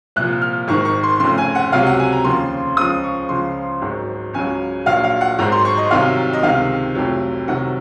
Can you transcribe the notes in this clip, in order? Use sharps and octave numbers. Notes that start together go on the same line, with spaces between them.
C2 A#2 F3 F#6
F6
G#1 G#2 D#3 C#6
C#6
C6
F1 F2 C#3 C6
G#5
F#5
C#2 C3 F#3 F5
F#5
G#5
A#5
D#2 C#3 F3 C6
C#2 C#3 F3 D#6
C#6
C#2 C#3 F3 C6
G#1 G#2 F#3
C#2 C#3 F#3 G#5
A#1 A#2 F#3 F5
F5
F#5
G#1 G#2 F#3 A#5
C6
C#6
D#5
C2 C3 D#3 F#3 F5
D#5
C#2 C3 D#3 F5
F1 F2 C3 F#3
C2 C3 D#3 F#3 F#5